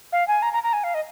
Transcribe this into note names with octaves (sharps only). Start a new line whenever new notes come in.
F5
G#5
A#5
A#5
A#5
G#5
F5
D#5